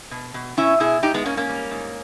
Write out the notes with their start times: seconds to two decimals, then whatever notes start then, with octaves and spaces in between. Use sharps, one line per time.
0.11 B2
0.34 B2
0.57 B2 C#4 E4
0.80 B2 E4 G#4
1.03 G#2 D#4 G4
1.14 G#3 B3
1.26 G#2 A#3 C#4
1.37 A#3 C#4
1.49 G3
1.71 G#2